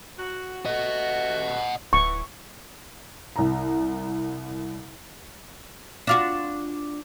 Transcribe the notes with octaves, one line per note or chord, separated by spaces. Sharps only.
F#4
A3 F#4 D#5 F#5
D1 E3 C#6
C2 A#5
D4 F4 F#4